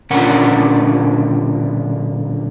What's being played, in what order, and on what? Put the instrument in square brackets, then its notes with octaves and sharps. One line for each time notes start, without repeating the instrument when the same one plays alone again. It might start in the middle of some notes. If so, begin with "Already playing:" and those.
[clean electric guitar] B1 A#2 D3 C#4 A#4 F#5